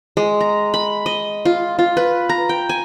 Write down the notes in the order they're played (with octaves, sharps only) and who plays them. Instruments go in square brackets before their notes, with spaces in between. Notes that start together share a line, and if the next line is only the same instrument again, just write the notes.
[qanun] G#3
A#5
B5
D#5
F4
F4
B4
A#5
G5
G#5